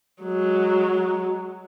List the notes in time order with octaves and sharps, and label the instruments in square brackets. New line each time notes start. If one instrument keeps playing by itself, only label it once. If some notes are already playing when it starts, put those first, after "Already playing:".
[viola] F#3 G#3